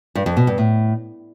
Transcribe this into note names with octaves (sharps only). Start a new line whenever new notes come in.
G2
F2
B2
G2
A2